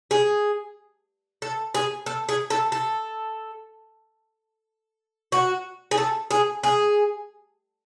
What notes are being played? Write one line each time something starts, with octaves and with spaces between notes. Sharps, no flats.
G#4
A4
G#4
A4
G#4
A4
A4
F#4
G#4
A4
G#4
G#4